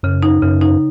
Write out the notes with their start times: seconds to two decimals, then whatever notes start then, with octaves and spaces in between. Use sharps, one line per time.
0.03 F#2 C#3
0.23 D#4
0.42 F#2 C#3
0.62 D#4